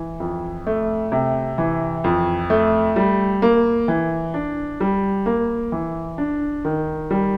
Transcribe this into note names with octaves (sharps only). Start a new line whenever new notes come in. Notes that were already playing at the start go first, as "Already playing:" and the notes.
Already playing: E3
F2
A3
C3
E3
F2
A3
G3
A#3
E3
D4
G3
A#3
E3
D4
D#3
G3